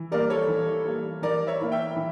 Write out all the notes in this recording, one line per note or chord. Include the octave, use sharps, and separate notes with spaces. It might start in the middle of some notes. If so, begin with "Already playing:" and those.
Already playing: E3
G3 A#3 A#4 D5
A4 C#5
E3
G3 A#3
E3 A#4 D5
C#5 E5
A#3 E4 A#4
E5 G5
E3